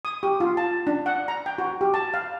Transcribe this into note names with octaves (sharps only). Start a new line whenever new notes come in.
D#6
G4
F4
A5
D4
F#5
A#5
G5
F#4
G4
A5
F5